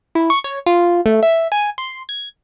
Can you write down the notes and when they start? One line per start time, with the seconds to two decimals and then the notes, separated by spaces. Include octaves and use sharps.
0.15 E4
0.30 C#6
0.44 C#5
0.66 F4
1.06 A3
1.23 E5
1.52 G#5
1.78 C6
2.09 G#6